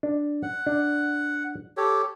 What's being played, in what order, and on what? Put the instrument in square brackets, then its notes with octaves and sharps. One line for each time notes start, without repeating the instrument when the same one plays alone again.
[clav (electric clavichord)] D4
[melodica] F#5
[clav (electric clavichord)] D4
[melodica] G4 A4 C#5